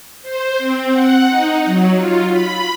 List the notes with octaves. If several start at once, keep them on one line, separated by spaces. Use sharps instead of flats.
C5
C4
F#5
D#4
F#3
F4
B5